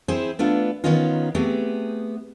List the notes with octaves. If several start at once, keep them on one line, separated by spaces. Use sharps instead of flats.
C4 E4 G#4 C5
A3 B3 D4 F4
D#3 B3 C#4 D#4 F4
A3 B3 C4 G4 G#4